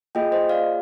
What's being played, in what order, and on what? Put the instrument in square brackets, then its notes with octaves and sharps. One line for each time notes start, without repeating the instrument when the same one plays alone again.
[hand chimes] A#3 F4 G#4 D#5 G5
C5 D#5
D5 F5